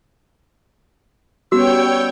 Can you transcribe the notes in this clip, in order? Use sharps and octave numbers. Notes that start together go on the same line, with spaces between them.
G3 B3 C#4 F#4 C#5 G5 E6